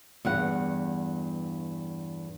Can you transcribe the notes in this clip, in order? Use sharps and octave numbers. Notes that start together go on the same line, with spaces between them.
E2 G2 F#5